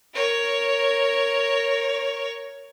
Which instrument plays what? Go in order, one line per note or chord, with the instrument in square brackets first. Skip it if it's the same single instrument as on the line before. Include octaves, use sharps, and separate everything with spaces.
[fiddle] A#4 C#5